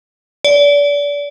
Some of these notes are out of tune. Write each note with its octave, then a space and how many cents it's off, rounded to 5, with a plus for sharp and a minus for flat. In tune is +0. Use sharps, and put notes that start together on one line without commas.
D5 -30